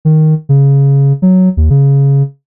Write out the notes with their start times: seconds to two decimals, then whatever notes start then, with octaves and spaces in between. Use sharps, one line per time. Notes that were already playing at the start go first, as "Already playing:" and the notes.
0.05 D#3
0.49 C#3
1.22 F#3
1.57 D#2
1.70 C#3